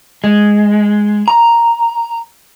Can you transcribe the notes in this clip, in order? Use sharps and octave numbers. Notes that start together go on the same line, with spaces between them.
G#3
A#5